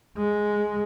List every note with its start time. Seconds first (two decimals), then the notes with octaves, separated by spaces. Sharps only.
0.17 G#3